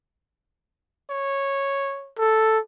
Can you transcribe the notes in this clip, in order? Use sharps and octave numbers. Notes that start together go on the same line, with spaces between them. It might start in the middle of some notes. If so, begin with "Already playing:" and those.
C#5
A4